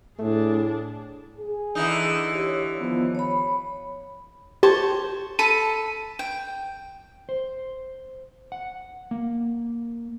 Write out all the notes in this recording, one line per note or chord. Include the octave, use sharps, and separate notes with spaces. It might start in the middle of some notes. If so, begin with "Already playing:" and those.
A2 A3 D4 G#4
G#4
D3 E3 D#4
G4 C#5
D#3 F3 B3
C#5 B5
G4 C5 C#5 A5
A4 B5 D#7
G5
C5
F#5
A#3